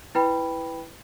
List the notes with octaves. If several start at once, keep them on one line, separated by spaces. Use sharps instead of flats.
E4 B4 G5 B5